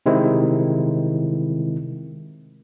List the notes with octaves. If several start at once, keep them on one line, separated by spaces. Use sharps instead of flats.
C3 D#3 G#3 C4 E4